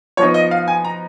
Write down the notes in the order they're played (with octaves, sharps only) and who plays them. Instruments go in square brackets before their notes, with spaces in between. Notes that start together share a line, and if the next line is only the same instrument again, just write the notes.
[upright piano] F3 B3 D#4 [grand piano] C#5
[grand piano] D#5
F5
G#5
A#5